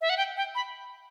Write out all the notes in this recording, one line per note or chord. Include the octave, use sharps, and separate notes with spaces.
E5
F#5
G5
G5
B5